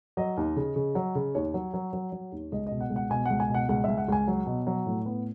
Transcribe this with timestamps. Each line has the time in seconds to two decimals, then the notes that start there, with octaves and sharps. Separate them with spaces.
0.17 F#3 D#5
0.37 D#2
0.56 C#3
0.76 C#3
0.95 F#3
1.15 C#3
1.35 D#2 C#5
1.54 F#3
1.74 F#3
1.93 F#3
2.12 F#3
2.32 D#2
2.52 C#2 D#5
2.66 B2 D#5
2.80 F#5
2.90 C#2
2.96 F#5
3.10 B2 G#5
3.25 C#2 F#5
3.40 G#5
3.49 B2
3.54 F#5
3.69 C#2 F#5
3.84 C#2 E5
3.98 F#5
4.08 C#2 G#5
4.27 F#3
4.46 B2
4.67 F#3
4.86 A2
5.06 B3